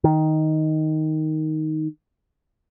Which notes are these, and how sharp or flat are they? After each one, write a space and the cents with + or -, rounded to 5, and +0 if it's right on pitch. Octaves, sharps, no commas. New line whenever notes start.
D#3 +5